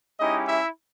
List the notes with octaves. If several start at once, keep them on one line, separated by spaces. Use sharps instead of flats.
G#3 C#4 D#4 E4 G4 D#5
E4 E5